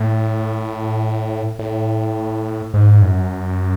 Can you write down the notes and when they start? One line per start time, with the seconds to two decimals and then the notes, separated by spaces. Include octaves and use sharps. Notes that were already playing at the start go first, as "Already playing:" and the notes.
Already playing: A2
1.59 A2
2.74 G#2
3.02 F#2